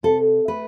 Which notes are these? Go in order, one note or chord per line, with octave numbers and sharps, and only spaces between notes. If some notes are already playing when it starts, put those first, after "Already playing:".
C3 A4
A3 B4